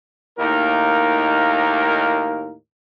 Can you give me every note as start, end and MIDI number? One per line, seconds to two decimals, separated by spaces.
0.39 2.53 39
0.39 2.53 45
0.39 2.53 58
0.39 2.53 63
0.39 2.53 70